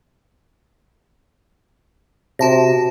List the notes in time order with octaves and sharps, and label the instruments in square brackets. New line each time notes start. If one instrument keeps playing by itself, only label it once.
[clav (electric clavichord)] C3 [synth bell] F#4 A5 A#6